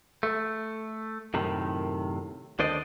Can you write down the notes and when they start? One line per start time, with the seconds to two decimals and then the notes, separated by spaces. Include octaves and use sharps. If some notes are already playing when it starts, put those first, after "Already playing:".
0.23 A3
1.34 F#2 A2 C3 D#3
2.59 D2 D#3 D4 C5 D5 D#5